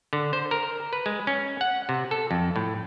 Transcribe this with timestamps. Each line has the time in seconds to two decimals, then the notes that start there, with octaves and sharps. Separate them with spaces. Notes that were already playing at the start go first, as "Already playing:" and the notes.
0.13 D3
0.33 C5
0.51 A#4
0.93 B4
1.06 G#3
1.27 C#4
1.61 F#5
1.89 C3
2.11 A4
2.31 F2
2.56 A2